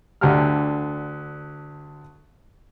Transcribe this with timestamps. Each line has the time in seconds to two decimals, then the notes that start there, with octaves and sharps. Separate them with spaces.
0.21 D2 D3 G4 A#5 F6